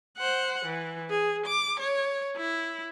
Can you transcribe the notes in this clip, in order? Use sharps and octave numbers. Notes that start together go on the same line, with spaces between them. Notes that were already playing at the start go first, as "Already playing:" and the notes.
C5 F#5
E3
G#4
D6
C#5
E4